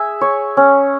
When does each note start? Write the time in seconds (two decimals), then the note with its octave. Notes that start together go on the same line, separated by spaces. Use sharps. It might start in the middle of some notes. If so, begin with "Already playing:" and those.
Already playing: G#4 E5
0.21 C#5
0.57 C#4